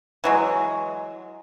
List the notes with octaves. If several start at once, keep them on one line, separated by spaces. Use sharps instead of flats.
E3 F#3 G#3